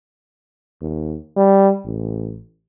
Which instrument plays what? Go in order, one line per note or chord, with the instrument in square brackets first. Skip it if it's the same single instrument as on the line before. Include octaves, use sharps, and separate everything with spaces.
[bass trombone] D#2
G3
A1